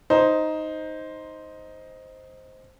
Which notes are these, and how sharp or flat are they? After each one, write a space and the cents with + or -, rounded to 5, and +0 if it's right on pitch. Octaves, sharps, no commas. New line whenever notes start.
D#4 +5 C5 +0